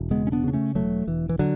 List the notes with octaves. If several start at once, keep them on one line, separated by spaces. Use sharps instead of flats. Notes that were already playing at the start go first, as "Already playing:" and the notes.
Already playing: E1
C#3 G#3 B3
C#4
B3 D4
C#3 D4
A3 C#4
E1 F#3 A3
E1 E3
E3
D3 F#3